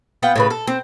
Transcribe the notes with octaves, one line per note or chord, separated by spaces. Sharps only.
B3 F4 F#5 G5
A2 C#3 B4
A4
C4